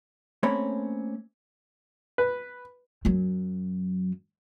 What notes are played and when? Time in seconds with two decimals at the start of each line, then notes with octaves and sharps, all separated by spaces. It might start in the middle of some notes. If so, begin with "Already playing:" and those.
0.43 A3 A#3 C4 C#4 C#5 B5
2.18 B4
3.05 F#2 F#3